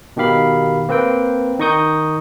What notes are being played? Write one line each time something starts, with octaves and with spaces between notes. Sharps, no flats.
B2 D#3 G4 F5 B5
A#3 C4 B4 C5 G5
D#3 D#4 D#5 C#6 D#6 G6